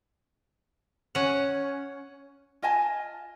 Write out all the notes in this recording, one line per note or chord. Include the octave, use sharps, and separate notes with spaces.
C#4 F#5
F4 D#5 G#5 A5